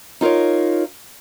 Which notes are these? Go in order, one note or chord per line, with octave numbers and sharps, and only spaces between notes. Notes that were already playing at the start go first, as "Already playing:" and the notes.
D#4 F4 A4 A#4 C#5